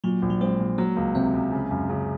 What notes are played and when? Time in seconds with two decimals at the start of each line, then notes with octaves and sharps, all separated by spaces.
0.04 A#2 F#3
0.22 A#1
0.30 F#3
0.41 G#3 C4
0.60 A#2
0.78 F#3 A#3
0.96 C#2
1.15 C3 C4
1.33 C#2
1.52 C#3
1.71 F#2
1.89 C#3